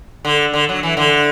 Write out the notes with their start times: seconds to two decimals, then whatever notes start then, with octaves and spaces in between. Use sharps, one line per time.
0.25 D3
0.54 D3
0.69 F#3
0.83 E3
0.97 D3